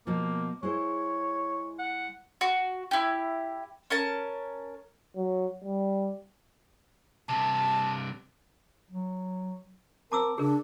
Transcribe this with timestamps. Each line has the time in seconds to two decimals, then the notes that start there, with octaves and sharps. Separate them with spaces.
0.07 B2 F3 A#3
0.63 G#3 E4 C5 C#5
1.79 F#5
2.41 F#4
2.91 E4 G4
3.90 C#4 A#4 A5
5.16 F#3
5.64 G3
7.29 G2 C3 A5
8.90 F#3
10.12 C4 A#4 A5 D6 E6
10.38 C#3 D4 G#4 A#4